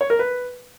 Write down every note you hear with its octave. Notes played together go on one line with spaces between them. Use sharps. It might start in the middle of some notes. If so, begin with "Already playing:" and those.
C#5
A#4
B4